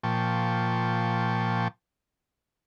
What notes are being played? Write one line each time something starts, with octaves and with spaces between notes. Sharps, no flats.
A#2 F3 G5 A5 C#6